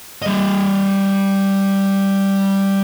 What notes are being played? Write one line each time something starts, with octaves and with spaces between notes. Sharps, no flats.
G3 D#5